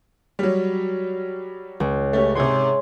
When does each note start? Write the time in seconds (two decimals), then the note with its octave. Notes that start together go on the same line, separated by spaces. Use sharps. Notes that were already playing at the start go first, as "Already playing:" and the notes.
0.39 F#3 G3
1.80 C#2
2.13 A3 C#4 G4
2.35 G#2 C3 G#4 C#5 C6